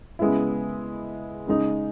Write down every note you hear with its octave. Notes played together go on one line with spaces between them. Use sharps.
C#3 G#3 B3 E4
C#3 G#3 D#4